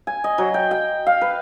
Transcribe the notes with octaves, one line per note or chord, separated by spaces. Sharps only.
G#5
D#5
F#3
G5
G5
F5
B4